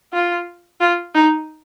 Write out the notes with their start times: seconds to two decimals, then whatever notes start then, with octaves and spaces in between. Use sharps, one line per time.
0.13 F4
0.80 F4
1.15 D#4